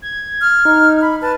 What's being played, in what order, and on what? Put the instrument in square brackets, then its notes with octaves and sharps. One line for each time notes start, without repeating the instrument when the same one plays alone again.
[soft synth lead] G#6
[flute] F6
[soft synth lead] D#4
[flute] B5
[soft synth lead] B4 [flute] A5